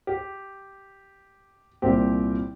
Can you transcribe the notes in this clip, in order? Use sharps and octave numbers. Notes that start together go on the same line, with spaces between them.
G4
C2 A#2 C4 G4